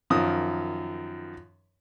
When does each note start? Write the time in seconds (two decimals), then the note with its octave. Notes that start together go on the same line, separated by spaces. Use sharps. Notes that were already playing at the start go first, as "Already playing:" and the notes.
0.10 F#2 D#3 F3 D#6